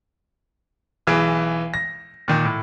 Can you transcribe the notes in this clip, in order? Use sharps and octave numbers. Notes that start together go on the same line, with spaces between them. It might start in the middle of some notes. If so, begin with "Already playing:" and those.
B1 E3 G#4 D7
A#6
A#2 D#3
A2